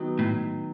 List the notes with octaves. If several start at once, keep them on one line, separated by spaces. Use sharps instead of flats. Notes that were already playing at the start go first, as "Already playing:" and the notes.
Already playing: D#3 F#3 B3 F#4
A2